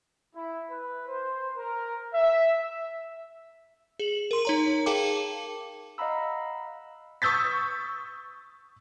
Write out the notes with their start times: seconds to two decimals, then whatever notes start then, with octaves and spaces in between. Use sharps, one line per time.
0.34 E4
0.69 B4
1.07 C5
1.55 A#4
2.14 E5
3.99 G#4 F#7
4.31 A#4 C6
4.45 D#4 C#5 A#5
4.86 G#4 A#4 F5 G5 A5 D6
5.98 D#5 F5 F#5 A#5 B5 E6
7.22 C#6 D#6 E6 G6 A6 B6